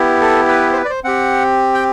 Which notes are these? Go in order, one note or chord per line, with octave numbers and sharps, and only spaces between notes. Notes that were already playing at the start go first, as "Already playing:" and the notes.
Already playing: B3 E4 G4
A4
B4
C5
B4
D5
C5
C4 G4 F#5
G5